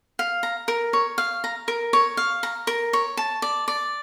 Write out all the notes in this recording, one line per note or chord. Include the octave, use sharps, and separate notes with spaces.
F5
A#5
A#4
C#5
F5
A#5
A#4
C#5
F5
A#5
A#4
C#5
A5
D5
D5